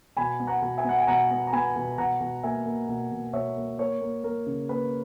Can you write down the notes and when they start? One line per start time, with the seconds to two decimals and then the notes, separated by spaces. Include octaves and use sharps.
0.17 B2 G#5 B5
0.40 B3
0.47 F#5 A#5
0.62 B2
0.78 E5 G#5
0.85 B3 F#5
0.99 G#5
1.07 B2 F#5 A#5
1.31 B3
1.47 A#5
1.53 B3 G#5 B5
1.76 B2
1.98 B2 F#5 A#5
2.20 B2
2.43 A#3 E5 G#5
2.66 A#3
2.88 B2
3.12 B2
3.33 B2 C#5 E5
3.57 A#3
3.79 A#3 A#4 C#5
4.01 A#3
4.24 A#3 A#4
4.46 C#3
4.69 A#3 B4